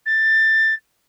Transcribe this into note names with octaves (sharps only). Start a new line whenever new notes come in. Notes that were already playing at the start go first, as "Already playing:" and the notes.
A6